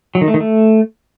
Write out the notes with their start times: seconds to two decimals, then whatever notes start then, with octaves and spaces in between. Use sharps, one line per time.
0.15 F#3
0.21 D#3
0.28 A3
0.34 D#3
0.40 A3